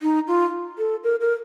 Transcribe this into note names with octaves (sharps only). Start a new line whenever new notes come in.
D#4
F4
A4
A#4
A#4